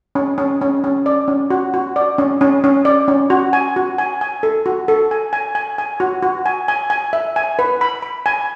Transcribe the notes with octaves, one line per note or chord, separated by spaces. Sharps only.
C#4
C#4
C#4
C#4
D5
C#4
F#4
F#4
D5
C#4
C#4
C#4
D5
C#4
F#4
G#5
F#4
G#5
G#5
A4
F#4
A4
G#5
G#5
G#5
G#5
F#4
F#4
G#5
G#5
G#5
E5
G#5
B4
B5
B5
G#5